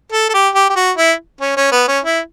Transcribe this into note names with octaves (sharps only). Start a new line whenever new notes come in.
A4
A4
G4
G4
G4
F#4
E4
C#4
C#4
B3
C#4
E4